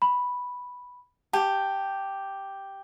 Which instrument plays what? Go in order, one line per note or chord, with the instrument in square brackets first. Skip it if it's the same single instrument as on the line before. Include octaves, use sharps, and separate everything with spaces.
[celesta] B5
[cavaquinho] G4 [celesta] A5